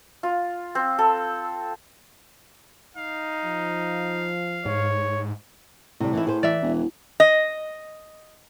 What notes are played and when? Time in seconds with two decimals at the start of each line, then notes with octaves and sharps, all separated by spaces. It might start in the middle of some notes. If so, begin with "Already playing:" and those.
0.23 F4
0.75 C4
0.99 A4
2.97 D#4 F5
3.45 F3
4.65 G#2 C#5
6.00 A2 C3 G3
6.13 E3 D#4 E4
6.27 G#4 B4 C5
6.43 E3 D5 E5
6.62 E1
7.20 D#5